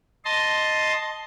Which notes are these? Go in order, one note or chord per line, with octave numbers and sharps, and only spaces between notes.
D#5 A5 C6